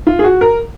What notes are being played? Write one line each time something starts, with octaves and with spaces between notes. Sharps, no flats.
F4
G#4
F#4
A#4